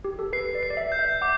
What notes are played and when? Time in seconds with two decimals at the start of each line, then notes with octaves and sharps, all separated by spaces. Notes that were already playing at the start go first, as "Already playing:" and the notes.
0.05 G4
0.19 A4
0.33 B4 C7
0.55 D5
0.63 C7
0.70 D5
0.77 E5
0.92 G6
0.99 E5
1.21 F#5 D6